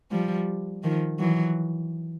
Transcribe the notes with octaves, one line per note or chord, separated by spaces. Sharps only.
F3 G3
D#3 F3
E3 F#3